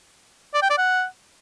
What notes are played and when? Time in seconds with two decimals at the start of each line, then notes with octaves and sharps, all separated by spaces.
0.54 D5
0.62 G5
0.70 D5
0.78 F#5